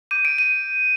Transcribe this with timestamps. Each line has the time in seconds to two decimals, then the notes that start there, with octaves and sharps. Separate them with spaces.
0.11 D6 G6 D#7
0.25 D7
0.38 D#7